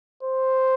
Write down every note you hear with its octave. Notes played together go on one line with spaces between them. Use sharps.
C5